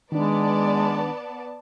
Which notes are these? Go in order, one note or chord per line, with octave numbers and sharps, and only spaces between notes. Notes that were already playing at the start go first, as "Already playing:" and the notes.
D#3 G#3 B3 D4 D5 A5